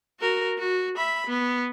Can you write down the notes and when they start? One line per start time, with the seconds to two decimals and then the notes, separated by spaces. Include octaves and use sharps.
0.20 F#4 A#4
0.58 F#4
0.97 E5 B5
1.27 B3